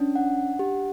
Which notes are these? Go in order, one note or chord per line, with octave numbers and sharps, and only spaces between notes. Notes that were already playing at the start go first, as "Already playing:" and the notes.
Already playing: C#4 D4
F#5
G4